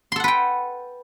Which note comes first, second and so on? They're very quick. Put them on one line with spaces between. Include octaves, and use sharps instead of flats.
C6 A4 F#5 B4 G5